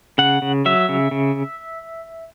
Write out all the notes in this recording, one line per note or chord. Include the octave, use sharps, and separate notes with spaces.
C#3 F#5
C#3
F#3 E5
C#3
C#3